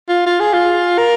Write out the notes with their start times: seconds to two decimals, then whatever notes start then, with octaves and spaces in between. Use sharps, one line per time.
0.09 F4
0.26 F4
0.40 G#4
0.53 F4
0.98 A#4